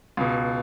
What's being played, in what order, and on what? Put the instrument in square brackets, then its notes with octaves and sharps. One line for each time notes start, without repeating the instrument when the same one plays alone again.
[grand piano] C#2 B2